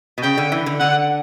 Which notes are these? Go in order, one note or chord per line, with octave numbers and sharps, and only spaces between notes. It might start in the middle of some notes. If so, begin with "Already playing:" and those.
B2
C#3 G5
D3
E3
D3
D3 F#5